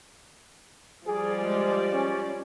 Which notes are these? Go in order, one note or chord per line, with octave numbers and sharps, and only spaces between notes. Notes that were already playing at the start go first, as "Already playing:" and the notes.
F3 G3 G#4 D5
G#3
C#4